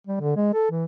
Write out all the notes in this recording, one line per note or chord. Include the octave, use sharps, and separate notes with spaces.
G3
D3
G#3
A4
E3